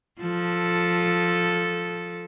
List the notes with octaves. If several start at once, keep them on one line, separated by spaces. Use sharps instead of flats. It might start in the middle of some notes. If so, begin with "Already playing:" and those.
F3 A4